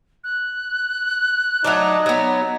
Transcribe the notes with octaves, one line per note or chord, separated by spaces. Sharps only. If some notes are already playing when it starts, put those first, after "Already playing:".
F#6
F#3 A3 D4 D#4
F#3 B3